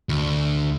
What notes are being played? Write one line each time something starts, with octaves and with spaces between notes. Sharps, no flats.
D2